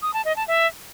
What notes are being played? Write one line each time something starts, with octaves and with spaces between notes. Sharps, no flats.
D#6
A5
D#5
A5
E5